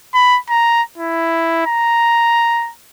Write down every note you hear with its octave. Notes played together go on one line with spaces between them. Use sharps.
B5
A#5
E4
A#5